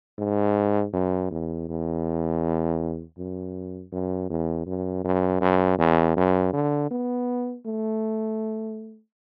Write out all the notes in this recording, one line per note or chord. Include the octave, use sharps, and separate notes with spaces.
G#2
F#2
E2
E2
F#2
F#2
E2
F#2
F#2
F#2
E2
F#2
D3
B3
A3